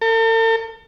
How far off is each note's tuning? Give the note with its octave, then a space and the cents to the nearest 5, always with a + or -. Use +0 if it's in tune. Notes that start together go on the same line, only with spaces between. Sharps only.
A4 +45